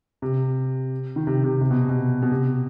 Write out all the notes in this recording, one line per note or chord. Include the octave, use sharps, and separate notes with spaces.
C3
D#3
C3
C3
C3
B2
B2
B2
C3